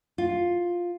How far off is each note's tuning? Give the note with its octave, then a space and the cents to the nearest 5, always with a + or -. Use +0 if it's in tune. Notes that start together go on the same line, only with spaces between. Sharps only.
F4 +5